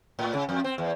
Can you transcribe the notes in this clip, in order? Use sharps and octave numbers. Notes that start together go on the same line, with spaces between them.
A2
C#3
F2
C4
E2